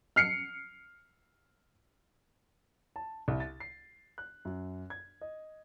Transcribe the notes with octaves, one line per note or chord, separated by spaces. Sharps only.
F6 C7 C#7
A5
C2
A6
C7
F#6
F#2
G#6
D#5